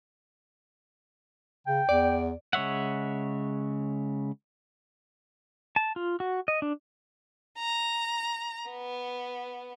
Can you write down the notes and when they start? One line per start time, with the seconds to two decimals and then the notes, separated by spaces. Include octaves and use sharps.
1.67 C#3 G5
1.89 E2 D5
2.53 C#3 G#3 C#5 E5 F#5
5.76 A5
5.96 F4
6.20 F#4
6.48 D#5
6.62 D4
7.59 A#5
8.70 B3